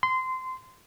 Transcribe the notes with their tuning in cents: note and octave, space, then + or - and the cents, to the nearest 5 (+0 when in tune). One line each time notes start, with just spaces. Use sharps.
C6 -20